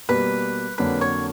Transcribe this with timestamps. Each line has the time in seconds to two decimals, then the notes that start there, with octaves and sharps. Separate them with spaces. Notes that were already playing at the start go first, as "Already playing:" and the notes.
0.09 B2 G3 A#3 B4
0.78 F2 D3 F#3 A#3 D4 B4
1.01 C#5